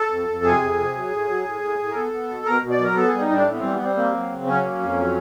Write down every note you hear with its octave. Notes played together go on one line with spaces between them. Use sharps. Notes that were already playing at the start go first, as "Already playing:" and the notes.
Already playing: A4
F2
F2
C3 G#4
F2
C3
F#3
A2
F#3
A2
A2
A2
A#4
B3 A4
B3
B2
B2 A#4
B2
D5
F#3 A#4
B3 A4
G3 G#4
D#4
A2 D4
E3
B3
G3 C4
B3
G3 C4
A#3 C4
F#3
C#3
F#3 C#4
A#3
F2
F#3